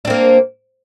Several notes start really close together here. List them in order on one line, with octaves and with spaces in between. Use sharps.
D4 C4 A#3